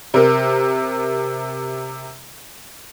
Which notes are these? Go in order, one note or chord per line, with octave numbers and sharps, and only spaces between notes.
C3 A#4